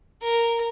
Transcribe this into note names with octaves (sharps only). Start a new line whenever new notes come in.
A#4